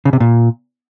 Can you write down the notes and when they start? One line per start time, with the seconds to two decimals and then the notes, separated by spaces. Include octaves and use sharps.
0.05 C#3
0.13 C3
0.20 A#2